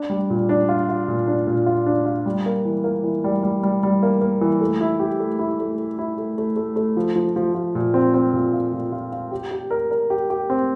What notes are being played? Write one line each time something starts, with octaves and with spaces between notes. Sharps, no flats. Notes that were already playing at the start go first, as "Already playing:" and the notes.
Already playing: D4
G3
A#2
D4
F4
F4
A#2
D4
A#2
F4
D4
F4
G3
A#3
E3
A#3
E3
G3
G3
G3
G3
A#3
A#3
E3
A3
E4
G4
A3
E4
A3
A3
E4
A3
A3
A3
A3
F3
F3
F3
F3
A#2
C4
C4
A#2
F4
A#2
F4
F4
G4
G4
A#4
A#4
G4
G4
C4